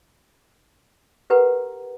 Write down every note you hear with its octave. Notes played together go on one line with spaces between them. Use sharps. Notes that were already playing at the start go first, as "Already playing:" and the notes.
G4 A#4 B4 F#5 A#5